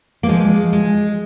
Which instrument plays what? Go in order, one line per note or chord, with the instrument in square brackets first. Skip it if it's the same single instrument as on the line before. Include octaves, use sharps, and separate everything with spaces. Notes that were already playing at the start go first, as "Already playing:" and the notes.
[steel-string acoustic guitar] A#3
F3 G#3
G#3